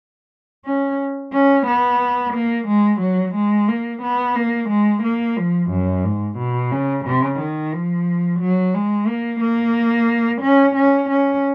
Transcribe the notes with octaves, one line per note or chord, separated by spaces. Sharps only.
C#4
C#4
B3
A#3
G#3
F#3
G#3
A#3
B3
A#3
G#3
A#3
F3
F#2
G#2
B2
C#3
C#3
D#3
F3
F#3
G#3
A#3
A#3
C#4
C#4
C#4